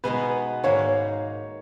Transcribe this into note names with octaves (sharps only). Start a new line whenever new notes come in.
B2 G#3 B3 D#4 B4
G#2 D#3 A#3 C#5